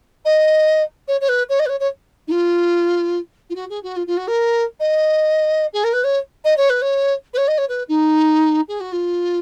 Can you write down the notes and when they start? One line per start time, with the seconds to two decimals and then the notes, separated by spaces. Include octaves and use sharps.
0.25 D#5
1.08 C#5
1.21 C#5
1.28 B4
1.49 C#5
1.59 D#5
1.66 B4
1.69 C#5
1.80 C#5
2.27 D#4
2.31 F4
3.50 F4
3.55 F#4
3.69 G#4
3.83 F#4
3.96 F4
4.07 F4
4.17 F#4
4.27 A#4
4.79 D#5
5.73 G#4
5.84 A#4
5.93 B4
6.04 C#5
6.44 D#5
6.57 C#5
6.69 B4
6.82 C#5
7.33 B4
7.37 C#5
7.48 D#5
7.58 C#5
7.69 B4
7.88 D#4
8.68 G#4
8.80 F#4
8.92 F4